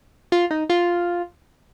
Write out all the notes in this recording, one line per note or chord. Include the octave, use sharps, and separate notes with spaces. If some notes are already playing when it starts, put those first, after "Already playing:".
F4
D#4
F4